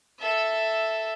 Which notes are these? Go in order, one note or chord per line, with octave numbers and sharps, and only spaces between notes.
A4 E5